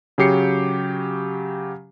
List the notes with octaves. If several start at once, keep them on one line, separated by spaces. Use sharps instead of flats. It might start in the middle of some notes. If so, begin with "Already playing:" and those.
C#3 F#3 G4 C7 C#7